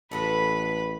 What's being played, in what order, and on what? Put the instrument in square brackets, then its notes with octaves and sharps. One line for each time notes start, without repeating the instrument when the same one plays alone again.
[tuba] A1 [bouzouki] G#3 F#4 A4 [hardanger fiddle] B4 B5